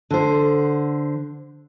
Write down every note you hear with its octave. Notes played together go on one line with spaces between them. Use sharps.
D3 C5